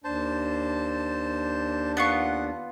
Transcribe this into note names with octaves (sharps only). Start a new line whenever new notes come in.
D#2 D4 C5 A5
B3 F4 F#5 C#6